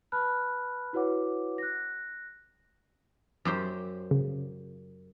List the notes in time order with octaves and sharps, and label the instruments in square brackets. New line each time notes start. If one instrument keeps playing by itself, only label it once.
[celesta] B4 A5 B5 F6 F#6
E4 F#4 B4 C#5 F#5 D6
F#6 A#6
[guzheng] F#2 G4 C5
[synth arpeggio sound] C#3